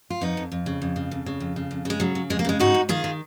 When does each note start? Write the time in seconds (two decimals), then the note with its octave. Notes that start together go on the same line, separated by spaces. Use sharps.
0.10 F4
0.21 F2 B3 D#4
0.37 F2
0.52 F2
0.66 C#3
0.82 F2
0.96 C#3
1.11 F2
1.26 C#3
1.40 F2
1.56 C#3
1.71 F2
1.85 C#3 G#3
2.00 C#3 F#3
2.15 C#3
2.30 F2 G#3
2.39 A#3
2.45 C#3 G#3
2.59 G#2 D#4 F#4
2.74 G#2
2.89 D#3 F4 G#4
3.04 D#3